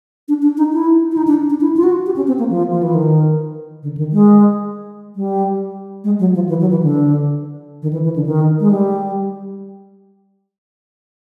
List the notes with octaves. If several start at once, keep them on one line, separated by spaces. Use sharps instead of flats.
D4
D4
D#4
E4
E4
D#4
D4
D4
E4
F4
F#4
G4
C#4
C4
A#3
F3
F3
E3
D#3
D3
D#3
G#3
G3
G#3
F#3
F3
E3
F#3
E3
D3
D#3
E3
E3
D3
D#3
G#3
G3